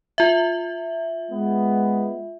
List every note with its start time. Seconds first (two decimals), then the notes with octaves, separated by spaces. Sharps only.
0.18 F4 E5
1.31 G#3 B3